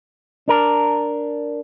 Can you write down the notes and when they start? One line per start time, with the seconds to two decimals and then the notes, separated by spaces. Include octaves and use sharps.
0.48 D4 A#4